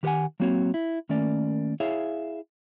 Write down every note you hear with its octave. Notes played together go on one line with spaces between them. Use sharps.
D#3 G4 B4 C#5 F#5 G#5
F#3 A#3 C4 F#4 C#5
E4
D#3 A3 A#3 C#4 D5
E4 G#4 C#5 E5 F5